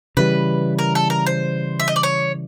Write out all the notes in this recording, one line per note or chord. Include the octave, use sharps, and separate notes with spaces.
C#3 E3 G3 B4
A#4
A4
A#4
C5
E5
D#5
D5
C#5